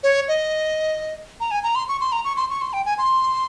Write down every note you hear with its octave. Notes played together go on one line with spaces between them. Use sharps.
C#5
D#5
A#5
G#5
A#5
C6
C#6
C6
A#5
C#6
C6
C#6
C6
G5
G#5
C6